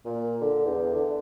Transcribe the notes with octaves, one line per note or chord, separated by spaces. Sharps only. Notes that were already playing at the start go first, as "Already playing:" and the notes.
A#2
D3
E2
D3